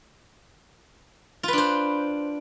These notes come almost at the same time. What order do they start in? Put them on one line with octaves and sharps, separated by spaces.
F4 B4 D4 C5